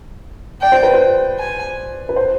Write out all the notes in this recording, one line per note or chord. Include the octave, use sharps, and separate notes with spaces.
D5 G5
C5
B4
C5
G#5
B4
C5